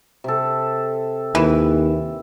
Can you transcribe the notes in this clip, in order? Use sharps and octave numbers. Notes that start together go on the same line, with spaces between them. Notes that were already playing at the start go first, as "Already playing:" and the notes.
C3 A4
D#2 E3